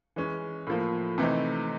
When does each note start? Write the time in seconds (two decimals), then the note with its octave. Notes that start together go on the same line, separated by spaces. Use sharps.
0.16 E3 G#3 C#4
0.67 A2 F3 A#3
1.18 C3 E3 A3 C4 D#4